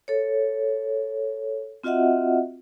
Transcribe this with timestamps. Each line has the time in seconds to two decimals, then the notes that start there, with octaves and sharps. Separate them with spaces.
0.08 A4 C#5
1.84 C4 F4 F#4 D#5 E5 F#5